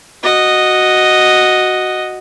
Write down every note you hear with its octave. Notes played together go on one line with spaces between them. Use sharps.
F#4 D#5